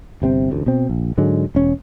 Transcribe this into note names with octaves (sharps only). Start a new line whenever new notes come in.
G1 C3 C4
A1 D2
B2 C4
A#1
G#2 D3 F#3 G#3
E1 C#4